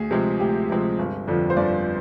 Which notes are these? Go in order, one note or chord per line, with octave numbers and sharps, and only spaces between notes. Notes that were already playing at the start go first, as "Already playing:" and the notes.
Already playing: D2 G#4
C3 F3 G#3 C4
D2 G4
C3 F3 G#3 C4
G1
F2 D3 F3
C5
G1 D5